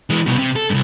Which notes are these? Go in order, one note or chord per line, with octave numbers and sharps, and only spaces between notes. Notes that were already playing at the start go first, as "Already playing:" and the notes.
E3 G#3
C2 B2
C3
A4
C2 G2